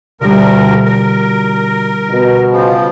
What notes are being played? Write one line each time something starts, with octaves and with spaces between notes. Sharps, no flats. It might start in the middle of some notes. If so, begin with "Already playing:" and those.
D2 B2 D3 F3 G3 A#4
A#4
B2
C#3 F3